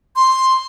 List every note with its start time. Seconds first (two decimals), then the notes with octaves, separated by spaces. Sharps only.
0.16 C6